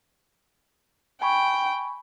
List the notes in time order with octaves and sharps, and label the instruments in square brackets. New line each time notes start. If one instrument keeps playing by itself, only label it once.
[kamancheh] G5 [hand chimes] G#5 B5 C#6